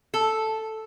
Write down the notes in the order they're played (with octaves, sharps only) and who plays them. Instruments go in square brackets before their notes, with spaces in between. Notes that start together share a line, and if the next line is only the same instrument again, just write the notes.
[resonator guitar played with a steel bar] A4